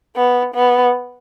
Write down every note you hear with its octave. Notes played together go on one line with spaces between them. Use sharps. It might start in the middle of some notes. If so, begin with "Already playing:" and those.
B3
B3